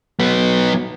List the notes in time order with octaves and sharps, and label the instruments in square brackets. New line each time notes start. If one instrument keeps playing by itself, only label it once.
[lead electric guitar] F#3 B3